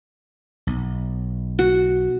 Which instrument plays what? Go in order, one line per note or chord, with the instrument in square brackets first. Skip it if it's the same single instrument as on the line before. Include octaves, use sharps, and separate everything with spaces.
[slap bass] B1
[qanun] F#4